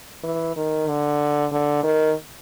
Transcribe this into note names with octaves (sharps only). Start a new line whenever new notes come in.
E3
D#3
D3
D3
D#3